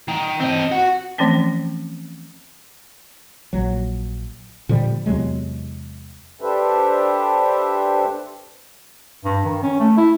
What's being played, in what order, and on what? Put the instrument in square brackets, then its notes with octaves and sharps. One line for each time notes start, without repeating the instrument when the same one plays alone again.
[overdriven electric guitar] D#3
C4 D#5
F#4
[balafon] E3 F3 A3 C4 C#4
[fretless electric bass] A#1 F#3
A#2 D3 F3 G3
E2 C3 F#3 G#3
[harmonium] D4 G4 A4 B4 C5 E5
[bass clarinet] G2
D#3
C#4
A3
E4